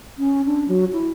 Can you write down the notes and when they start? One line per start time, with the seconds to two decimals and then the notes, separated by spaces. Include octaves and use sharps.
0.18 C#4
0.45 D4
0.68 F#3
0.93 E4